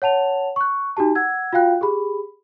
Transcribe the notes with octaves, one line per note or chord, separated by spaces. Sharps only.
C#5 F#5 A5 F7
C#6 F#6
D#4 F#4 G4 A5
F#5 E6 G#6
F4 F#4 F5 G5 F#6
G4 G#4 B5